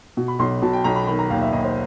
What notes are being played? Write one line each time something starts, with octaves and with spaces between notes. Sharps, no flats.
B2
B5
B1 C6
B2 A5
G5
B1 A#5
B5
D#3 B5
A#5
D#2 F5
E5
D#2 D#5
C5